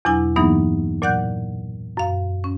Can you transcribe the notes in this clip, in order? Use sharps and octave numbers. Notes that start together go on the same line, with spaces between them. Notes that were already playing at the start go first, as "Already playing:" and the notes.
E2 B2 F#3 D4 E4 G#5
G2 E3 F#3 A#3 B3 D#4
A#2 F#3 D5 F#5 F#6 G6
F#2 F5
C#4